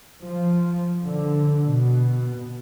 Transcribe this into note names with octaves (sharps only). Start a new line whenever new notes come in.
F3
D3
B2